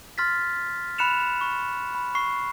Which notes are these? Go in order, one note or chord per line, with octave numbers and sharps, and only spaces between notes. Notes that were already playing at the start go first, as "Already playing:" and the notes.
C6 F6 A6 B6
B5 F#6 C#7 E7 F7
C#6
B5
C#6 C7